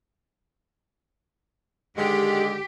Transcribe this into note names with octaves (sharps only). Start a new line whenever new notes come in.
D3 D#3 G#3 G4